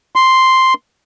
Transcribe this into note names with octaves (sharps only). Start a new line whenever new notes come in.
C6